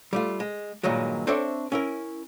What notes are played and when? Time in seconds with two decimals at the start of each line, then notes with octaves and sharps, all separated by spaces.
0.13 G3 A3 F4
0.40 G#3
0.83 G2 A#2 D#3 F#3 G#3
1.27 C4 D4 A4 C5 C#5 E5
1.72 C#4 E4 A#4